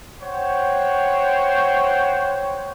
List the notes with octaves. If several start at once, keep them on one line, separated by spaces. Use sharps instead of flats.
C5 C#5 F#5 G5